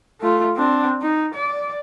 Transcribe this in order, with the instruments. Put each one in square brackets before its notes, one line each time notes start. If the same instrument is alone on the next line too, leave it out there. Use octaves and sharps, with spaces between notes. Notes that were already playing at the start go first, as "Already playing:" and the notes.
[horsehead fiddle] A3 F4
C4 D4
D#4
D5